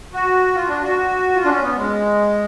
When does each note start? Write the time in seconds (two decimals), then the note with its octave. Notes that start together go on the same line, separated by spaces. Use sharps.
0.13 F#4
0.55 F4
0.68 D4
0.82 F#4
1.36 F4
1.45 D4
1.49 C#4
1.62 B3
1.76 G#3